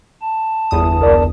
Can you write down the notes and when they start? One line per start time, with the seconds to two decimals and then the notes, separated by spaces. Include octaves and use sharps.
0.21 A5
0.71 G1 E2 D#6
1.00 C2 A#4 D5